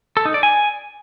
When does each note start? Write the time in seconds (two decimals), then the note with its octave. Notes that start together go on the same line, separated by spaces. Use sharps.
0.17 A4
0.25 D#4
0.34 D5
0.43 G#5